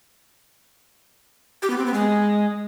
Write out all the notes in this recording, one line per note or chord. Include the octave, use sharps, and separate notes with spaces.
G4
B3
C4
B3
G#3